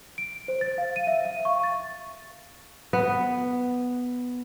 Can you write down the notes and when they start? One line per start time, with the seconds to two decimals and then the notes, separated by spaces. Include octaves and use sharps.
0.18 D7
0.48 C5
0.61 A6
0.78 F5
0.96 D#7
1.07 E5
1.25 F5
1.45 C#6
1.63 A6
2.93 B3